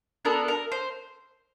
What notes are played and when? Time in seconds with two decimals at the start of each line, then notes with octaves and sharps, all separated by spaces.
0.25 B3 D4 F#4 A4 A#4
0.48 A#4
0.72 C5